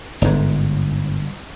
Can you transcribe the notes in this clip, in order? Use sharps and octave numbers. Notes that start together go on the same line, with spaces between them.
G1 G#2